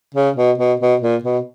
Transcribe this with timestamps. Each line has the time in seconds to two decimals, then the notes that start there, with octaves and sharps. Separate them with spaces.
0.15 C#3
0.36 B2
0.58 B2
0.80 B2
1.01 A#2
1.23 B2